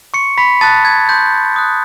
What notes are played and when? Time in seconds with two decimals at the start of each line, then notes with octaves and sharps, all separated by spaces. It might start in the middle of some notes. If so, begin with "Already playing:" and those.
0.14 C6 C#6 C#7
0.38 B5 B6
0.61 A5 D#6 F#6 A6
0.85 G#6
1.09 C6 G6
1.56 D#6 F#6